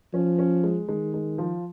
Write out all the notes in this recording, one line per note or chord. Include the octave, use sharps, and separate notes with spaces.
F3 C#4
C#4
G#3
D#3 G#3
G#3
F3